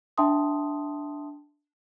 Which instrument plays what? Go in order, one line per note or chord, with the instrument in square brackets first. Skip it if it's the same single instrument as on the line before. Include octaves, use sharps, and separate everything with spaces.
[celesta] D4 E5 G5 A5 C6 D#6